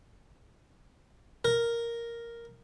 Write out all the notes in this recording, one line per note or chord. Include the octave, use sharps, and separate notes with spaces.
A#4